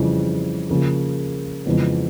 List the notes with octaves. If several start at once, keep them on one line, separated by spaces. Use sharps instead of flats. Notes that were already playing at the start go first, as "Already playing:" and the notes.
Already playing: F2 C#3 E3 G3
C#3 F3 A#3
F2 C#3 E3 G#3 B3